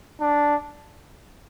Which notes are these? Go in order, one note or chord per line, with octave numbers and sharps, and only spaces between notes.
D4